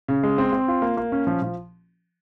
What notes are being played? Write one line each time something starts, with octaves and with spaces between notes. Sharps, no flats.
C#3
G#3
C4
C4
F4
A#3
A#3
C#4
F3
F3